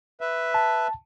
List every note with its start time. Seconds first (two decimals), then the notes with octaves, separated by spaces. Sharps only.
0.21 B4 E5
0.54 A5